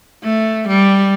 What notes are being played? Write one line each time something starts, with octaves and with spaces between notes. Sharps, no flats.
A3
G3